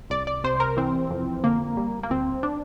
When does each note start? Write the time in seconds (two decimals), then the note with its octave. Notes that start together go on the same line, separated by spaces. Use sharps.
0.10 C2 D5
0.27 D5
0.44 C3 C5
0.60 A#4
0.77 E3 C4
1.10 F2
1.44 D3 A#3
1.77 G3
2.03 A#3
2.10 D2 C4
2.43 D4